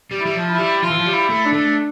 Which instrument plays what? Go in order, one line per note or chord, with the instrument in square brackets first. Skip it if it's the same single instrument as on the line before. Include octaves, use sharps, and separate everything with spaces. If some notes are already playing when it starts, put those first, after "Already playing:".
[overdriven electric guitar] G3
[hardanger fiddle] E4
[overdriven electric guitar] G3
F3
[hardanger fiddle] E4
[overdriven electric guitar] G3
[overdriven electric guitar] F3 [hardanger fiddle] F4
[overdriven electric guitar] E3
F3
G3
[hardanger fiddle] E4
[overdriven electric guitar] A3
[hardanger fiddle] D4
[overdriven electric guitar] A3